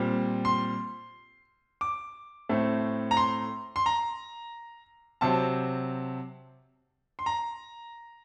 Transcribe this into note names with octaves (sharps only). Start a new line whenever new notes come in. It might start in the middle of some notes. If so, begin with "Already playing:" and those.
Already playing: A#2 G3 C4
C6
D6
A2 A3 C4
A#5
C6
C6
A#5
C3 F#3 C4 A5
C6
A#5